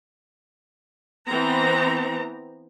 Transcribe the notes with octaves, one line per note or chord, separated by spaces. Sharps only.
E3 B3 C4 A#5